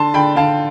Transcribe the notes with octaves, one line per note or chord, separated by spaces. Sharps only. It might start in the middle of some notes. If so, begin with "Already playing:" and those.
Already playing: D3 A5 C6
D3 G5 B5
D3 F5 A5